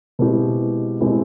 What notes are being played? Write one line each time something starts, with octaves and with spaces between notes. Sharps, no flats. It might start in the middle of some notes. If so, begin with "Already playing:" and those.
B2 G#3 C4 E4 G4
B2 G#3 C4 E4 G4